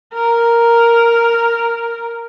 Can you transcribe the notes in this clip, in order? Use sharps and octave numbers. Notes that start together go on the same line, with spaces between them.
A#4